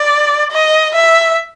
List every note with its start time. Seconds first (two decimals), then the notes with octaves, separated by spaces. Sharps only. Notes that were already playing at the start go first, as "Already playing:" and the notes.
Already playing: D5
0.51 D#5
0.95 E5